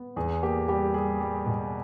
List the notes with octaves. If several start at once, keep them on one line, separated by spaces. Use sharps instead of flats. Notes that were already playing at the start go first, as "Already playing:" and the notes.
Already playing: B3
E2 G#4
A#3 G4
G3 G4
G3 G#4
G3
B2